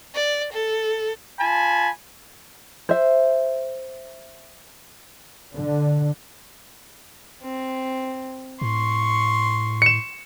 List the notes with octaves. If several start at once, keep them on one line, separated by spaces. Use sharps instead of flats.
D5
A4
F4 G#5 A5 B5
C5 E5
D3
C4
A2 C6 C#6
C#7 E7